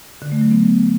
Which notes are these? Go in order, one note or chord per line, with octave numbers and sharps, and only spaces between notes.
D3
A3
F#3
B3